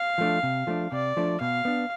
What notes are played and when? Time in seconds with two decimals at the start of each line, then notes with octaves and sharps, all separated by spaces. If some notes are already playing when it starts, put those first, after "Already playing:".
Already playing: F5
0.18 F3 A3 D4
0.43 C3
0.67 F3 A3 D4
0.92 C3 D5
1.17 F3 A3 D4
1.41 B2 F5
1.65 B3 D4